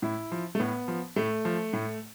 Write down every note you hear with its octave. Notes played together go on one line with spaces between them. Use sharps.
A2 E4
F3
A3
A2 B3
F3
A2 A3
F3
A2